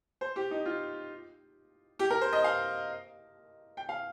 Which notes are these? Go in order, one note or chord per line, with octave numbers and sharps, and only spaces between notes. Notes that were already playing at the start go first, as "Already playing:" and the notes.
C5
G4
D#4
F4
G4
A#4
C5
D#5
F5
G5
F5